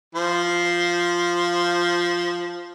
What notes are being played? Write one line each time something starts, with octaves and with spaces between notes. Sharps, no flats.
F3 C5